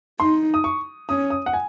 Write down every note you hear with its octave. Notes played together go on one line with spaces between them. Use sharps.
D#4 C6
D#6
C#6
C#4 D#6
D#6
F#5
G#5